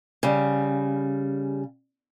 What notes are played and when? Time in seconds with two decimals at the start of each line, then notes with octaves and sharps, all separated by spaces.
0.23 C#3 G3